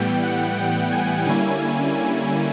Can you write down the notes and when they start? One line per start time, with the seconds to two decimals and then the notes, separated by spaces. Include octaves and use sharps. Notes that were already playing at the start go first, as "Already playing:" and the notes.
Already playing: A2 E3 G3 B3 G5
0.23 F#5
0.57 G5
0.92 G#5
1.26 D3 G3 A#3 C#4 E4 G#5
1.61 G#5
1.95 G#5